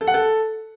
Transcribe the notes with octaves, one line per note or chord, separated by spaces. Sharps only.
A4
F#5
A4